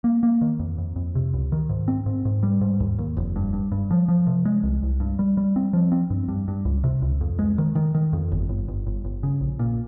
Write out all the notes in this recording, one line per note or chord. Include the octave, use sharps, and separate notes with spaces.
A#3
A#3
D#3
F2
F2
F2
C3
C#2
D#3
G#2
C4
G#2
G#2
G3
G#2
D#2
D#2
F1
G2
G2
G2
F3
F3
C3
G#3
C2
C2
G2
G3
G3
C4
F3
C4
G2
G2
G2
C#2
C3
C#2
F2
G#3
D#3
D#3
D#3
F2
G1
G1
G1
G1
G1
C#3
A#1
A#2